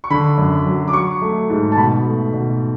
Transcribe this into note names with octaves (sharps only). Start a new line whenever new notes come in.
C#6
D3 B5
F#2
F#3
D6
F#3 C#6
A3
G#2
A5
B2 B5
A3
B2